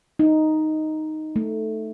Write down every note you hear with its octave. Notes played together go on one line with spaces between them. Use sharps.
D#4
A3